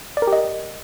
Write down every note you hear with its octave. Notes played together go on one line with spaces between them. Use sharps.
D5
A#4
G4
D#5